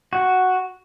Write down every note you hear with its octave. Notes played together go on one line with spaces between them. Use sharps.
F#4